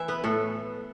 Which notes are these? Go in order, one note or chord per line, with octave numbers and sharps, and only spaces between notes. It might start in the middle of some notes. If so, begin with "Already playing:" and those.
Already playing: E3 E5
B3 B4
A2 A4